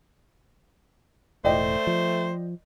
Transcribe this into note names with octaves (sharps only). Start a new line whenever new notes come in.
E1 A2 A3 C5 D5 D#5 G5
F3